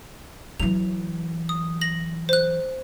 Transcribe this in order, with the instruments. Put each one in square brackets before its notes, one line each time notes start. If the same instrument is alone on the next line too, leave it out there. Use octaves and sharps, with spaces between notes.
[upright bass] E3 F#3 [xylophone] F7
[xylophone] D#6
A#6 F#7
C5 F#6